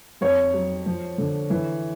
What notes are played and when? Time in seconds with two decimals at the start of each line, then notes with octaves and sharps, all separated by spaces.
0.21 F2 C#5
0.54 F#3
0.86 F3
1.18 D3
1.50 E3